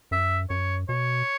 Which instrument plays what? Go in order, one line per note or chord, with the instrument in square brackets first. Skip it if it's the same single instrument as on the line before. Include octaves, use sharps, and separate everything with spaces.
[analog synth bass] F#2 [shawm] E5
[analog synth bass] F#2 [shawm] C#5
[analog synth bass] B2 [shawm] C#5